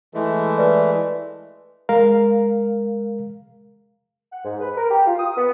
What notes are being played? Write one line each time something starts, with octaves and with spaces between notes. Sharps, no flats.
E3 G#3 A3
B4 D5
G#3 A#4 F5
F#5
G#2
B4
A#4
G4
F4
D#6
B3